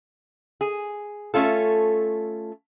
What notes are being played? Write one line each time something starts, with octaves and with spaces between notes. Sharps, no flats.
G#4
A3 C#4 F4 A4